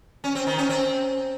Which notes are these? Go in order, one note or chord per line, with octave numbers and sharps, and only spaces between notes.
C#4
C4
D#3
C#4
C4